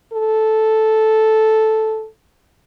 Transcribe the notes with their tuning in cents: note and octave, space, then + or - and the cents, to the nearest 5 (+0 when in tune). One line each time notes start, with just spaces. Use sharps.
A4 -5